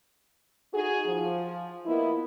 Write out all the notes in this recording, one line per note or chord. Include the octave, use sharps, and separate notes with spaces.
D#4 F#4 G#4
F3
F3 A#3 B3 E4 A#4 D#5